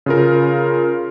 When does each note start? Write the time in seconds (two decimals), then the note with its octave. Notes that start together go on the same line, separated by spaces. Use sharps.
0.06 C#3 F4 A#4